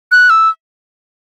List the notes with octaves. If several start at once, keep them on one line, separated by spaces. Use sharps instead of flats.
F#6
E6